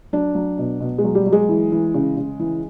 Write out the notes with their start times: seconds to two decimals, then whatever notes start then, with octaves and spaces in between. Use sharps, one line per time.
0.13 F#3 D4
0.35 F#3
0.58 B2
0.80 B2
0.98 G#3
1.04 F#3
1.15 G3
1.26 F#3
1.32 G#3
1.49 E3
1.72 E3
1.94 C#3
2.17 C#3
2.39 E3